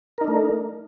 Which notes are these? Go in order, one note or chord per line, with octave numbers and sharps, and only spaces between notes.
A3 D4 D#4 A#4